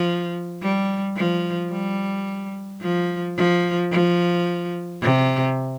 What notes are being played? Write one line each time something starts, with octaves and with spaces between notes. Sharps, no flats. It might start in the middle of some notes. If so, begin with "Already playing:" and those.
Already playing: F3
G3
F3
G3
F3
F3
F3
C3